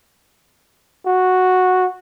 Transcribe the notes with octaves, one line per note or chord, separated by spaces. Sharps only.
F#4